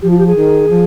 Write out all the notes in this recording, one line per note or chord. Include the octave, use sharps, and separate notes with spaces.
F3 G4
F4
G4
G#4
D#3
F3